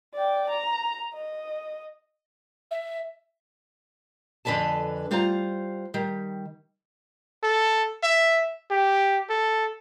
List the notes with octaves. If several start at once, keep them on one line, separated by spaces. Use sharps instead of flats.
D5 G5
A#5
D#5
E5
F2 D3 A4 B4 G#5 A5
G3 F4 C5 F#5 A#5
D#3 G3
A4
E5
G4
A4